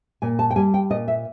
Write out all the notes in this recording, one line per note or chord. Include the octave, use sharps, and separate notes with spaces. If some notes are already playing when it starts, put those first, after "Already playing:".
A#2 G#5
A5
G5
G3 G#5
G5
A#2 D#5
E5